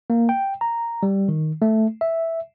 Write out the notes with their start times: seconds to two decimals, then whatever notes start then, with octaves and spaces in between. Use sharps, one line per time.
0.10 A#3
0.29 G5
0.61 A#5
1.03 G3
1.29 D#3
1.62 A3
2.01 E5